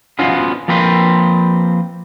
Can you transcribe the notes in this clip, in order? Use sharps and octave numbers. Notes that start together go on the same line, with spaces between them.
B3 C#4 F4 F#4 C5
F3 A#3 C4 B4 C5